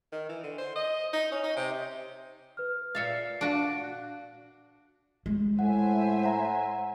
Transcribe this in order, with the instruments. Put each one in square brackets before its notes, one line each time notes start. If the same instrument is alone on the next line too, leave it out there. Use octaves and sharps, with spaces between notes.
[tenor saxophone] D#3
E3
D3
C5
D#5
D#4
C#4
D#4
C3
[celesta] B4 F6
[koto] A#2 E5 F5 [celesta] A6 C7 C#7
[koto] D4 F#4 [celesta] F5 F#6 D7
[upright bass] G#3
[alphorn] A2 [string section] C5 E5 G#5 [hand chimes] F#5
[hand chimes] F#5 A#5